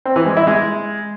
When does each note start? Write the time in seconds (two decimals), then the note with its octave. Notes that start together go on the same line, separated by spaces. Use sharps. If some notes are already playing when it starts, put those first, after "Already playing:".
0.05 C4
0.16 E3
0.26 G#3
0.37 E4
0.47 G#3